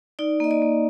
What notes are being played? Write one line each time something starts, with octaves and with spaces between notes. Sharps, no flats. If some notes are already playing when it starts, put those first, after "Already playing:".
D#4 D5
A#3 D#5
D5
A#3